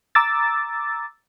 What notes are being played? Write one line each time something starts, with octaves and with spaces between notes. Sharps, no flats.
A#5 D6 E6 A6